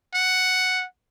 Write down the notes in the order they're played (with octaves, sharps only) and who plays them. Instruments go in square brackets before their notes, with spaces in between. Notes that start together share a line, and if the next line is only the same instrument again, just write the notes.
[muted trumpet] F#5